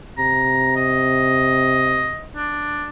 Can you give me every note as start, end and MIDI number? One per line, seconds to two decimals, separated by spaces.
0.18 2.15 48
0.18 0.75 82
0.76 2.22 75
2.36 2.89 62